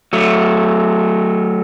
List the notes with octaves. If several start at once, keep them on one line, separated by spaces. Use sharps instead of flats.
F#3 A3